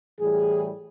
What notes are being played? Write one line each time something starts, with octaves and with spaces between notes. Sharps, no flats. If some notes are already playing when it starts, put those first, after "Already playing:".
A2 E3 G3 G#4